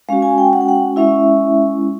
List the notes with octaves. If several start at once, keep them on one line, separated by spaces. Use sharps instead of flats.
G#3 C#4 F#4 F5
G#5
G5
F#5
G5
F#5
G#3 C#4 E4 E5